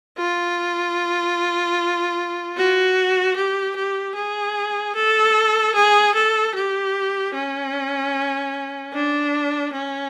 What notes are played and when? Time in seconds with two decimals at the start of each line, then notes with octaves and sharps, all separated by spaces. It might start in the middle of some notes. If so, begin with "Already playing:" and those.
0.18 F4
2.57 F#4
3.36 G4
3.76 G4
4.16 G#4
4.95 A4
5.75 G#4
6.15 A4
6.55 G4
7.34 C#4
8.93 D4
9.73 C#4